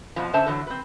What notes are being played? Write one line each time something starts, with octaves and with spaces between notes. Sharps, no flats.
F2 B2 F3
D3 C#4 C5 E5 A5
D3 E3 F#3
C4 B4